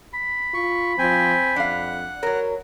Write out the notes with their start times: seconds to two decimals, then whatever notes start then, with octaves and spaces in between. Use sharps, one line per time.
0.14 B5
0.54 F4 C#6
0.98 F3 C4 G5 G#5
1.56 F2 D4 F5 F#5
2.23 F#3 A#4 C#5